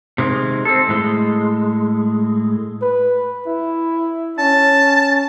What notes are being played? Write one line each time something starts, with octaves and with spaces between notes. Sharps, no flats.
C3 D#3 G#3
C4 A4
A2 G#3
B4
E4
C#4 A5